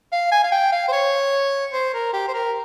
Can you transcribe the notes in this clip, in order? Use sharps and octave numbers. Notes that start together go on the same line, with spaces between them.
F5
G#5
F5
G5
F5
C5
C#5
C5
A#4
G4
C5
A#4